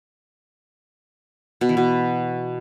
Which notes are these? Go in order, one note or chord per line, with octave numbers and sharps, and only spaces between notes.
B2
E3
B2